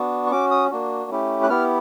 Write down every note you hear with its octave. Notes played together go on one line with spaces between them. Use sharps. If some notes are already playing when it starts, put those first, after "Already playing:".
Already playing: B3 D4 F#4
C#6
C#4 F#4 D6
D#6
A#3 D4 F#4
A3 C#4 E4 G4
F#6
B3 E4 G4 F6